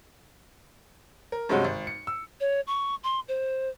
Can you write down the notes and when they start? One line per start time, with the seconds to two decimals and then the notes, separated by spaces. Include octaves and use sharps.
1.32 A#4
1.49 G2 C3 F#3 G#3 C#4 F#4
1.65 G#1
1.87 C#7
2.07 E6
2.40 C#5
2.67 C#6
3.04 C6
3.28 C5